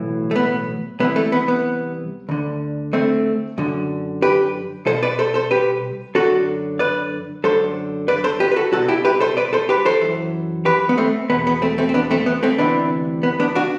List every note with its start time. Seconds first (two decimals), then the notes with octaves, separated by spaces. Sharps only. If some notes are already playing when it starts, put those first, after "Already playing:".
Already playing: B1 A2 E3
0.31 A3
0.36 B3
1.00 C2 C3 E3 B3
1.16 A3
1.32 B3
1.48 B3
2.29 D2 D3
2.93 A3 C4
3.58 F#2 D3
4.22 G4 B4
4.86 C2 B2 A4 C5
5.03 B4 D5
5.19 A4 C5
5.34 A4 C5
5.51 G4 B4
6.15 F#2 D3 F#4 A4
6.79 B4 D5
7.44 F#2 D3 A4 C5
8.08 B4 D5
8.24 A4 C5
8.40 G4 B4
8.52 B4
8.56 F#4 A4
8.73 C2 B2 F#4 A4
8.88 E4 G4
9.05 G4 B4
9.20 A4 C5
9.37 B4 D5
9.53 A4 C5
9.69 G4 B4
9.85 A4 C5
10.01 F#2 E3
10.65 G4 B4
10.89 B3
10.97 A3 C4
11.30 E2 B2 B3
11.47 B3
11.62 A3 C4
11.78 A3 C4
11.89 C4
11.94 B3 D4
12.11 A3 C4
12.26 B3
12.43 A3 C4
12.58 D2 C3 E3 B3 D4
13.23 B3
13.40 B3 D4
13.55 D4 F#4